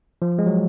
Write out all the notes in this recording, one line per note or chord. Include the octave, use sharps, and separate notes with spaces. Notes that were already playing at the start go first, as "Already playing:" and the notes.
F3
G#3
F#3